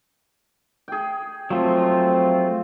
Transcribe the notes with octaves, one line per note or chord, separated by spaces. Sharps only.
G#4 G5
F3 F#3 A3 C4 F4